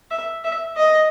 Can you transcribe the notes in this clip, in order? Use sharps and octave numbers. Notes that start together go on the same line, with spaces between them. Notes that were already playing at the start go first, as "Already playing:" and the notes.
E5
E5
D#5